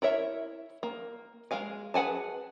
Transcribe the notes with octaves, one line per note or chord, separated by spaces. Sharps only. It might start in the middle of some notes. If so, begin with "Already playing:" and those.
E4 A#4 C#5 E5
A#3
G#3 A#4 F5 G#5
G#4 B4 F#5 G#5 A5